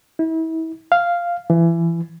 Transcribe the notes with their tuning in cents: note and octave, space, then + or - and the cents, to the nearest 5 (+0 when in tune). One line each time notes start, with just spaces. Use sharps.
E4 -35
F5 -5
E3 +25